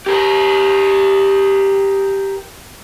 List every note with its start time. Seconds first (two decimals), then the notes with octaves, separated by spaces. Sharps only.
0.06 G4 A#4